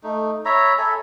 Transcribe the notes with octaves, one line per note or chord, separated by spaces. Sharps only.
A3 D#4
C#5 E5 A#5 B5
A4 E5 G#5 B5